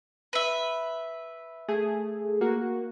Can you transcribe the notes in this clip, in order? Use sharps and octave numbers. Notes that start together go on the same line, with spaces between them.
B4 E5
A3 G#4
A#3 F#4